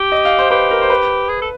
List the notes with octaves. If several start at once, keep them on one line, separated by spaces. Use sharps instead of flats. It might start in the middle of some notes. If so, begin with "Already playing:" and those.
Already playing: G4
D#5
F5
C5
G4 B4
A#4
C5
B4
G#4
A4